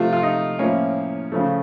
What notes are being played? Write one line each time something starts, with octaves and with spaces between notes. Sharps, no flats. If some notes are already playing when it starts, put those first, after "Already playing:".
Already playing: C3 F3 A3 F4
F4
D#4
A2 F3 A#3 C#4
C#3 F3 A3